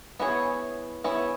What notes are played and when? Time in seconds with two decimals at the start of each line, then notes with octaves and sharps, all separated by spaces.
0.19 B3 E4 G#4 C#5
1.04 B3 E4 G#4 C#5